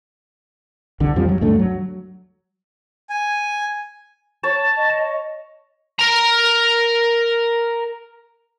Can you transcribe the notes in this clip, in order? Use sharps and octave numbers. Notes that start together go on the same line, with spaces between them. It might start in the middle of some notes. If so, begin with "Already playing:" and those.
C2 D3
F2 F3 G3 C4
F#3
D2 G2 A3 D4
F#3
G#5
C#5 A5
D#5
A#4 A#5